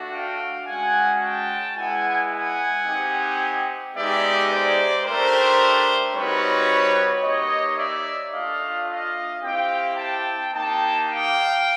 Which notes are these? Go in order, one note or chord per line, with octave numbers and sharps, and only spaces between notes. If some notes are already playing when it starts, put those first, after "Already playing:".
Already playing: A3 D4 F#4
F5 G5
G#3 C#4 F#4 F#5 G#5
G5 A5
G#3 B3 E4 F#5 G#5
F#5 G#5
C4 D#4 G4
G#3 B3 D#4 G4 D5 E5
C5 D5
A3 D4 G4 A#4 C5
G3 C4 D#4 F#4 B4 C#5
A#3 D#4 G4 C#5 D#5
D5 E5
A3 D4 F4 D#5 F5
D#5 F5
C4 E4 G4 F5 G5
G5 A5
A#3 D#4 G4 G5 A5
F5 G5